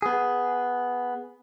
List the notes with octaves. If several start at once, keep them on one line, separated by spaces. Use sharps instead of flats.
B3 G#4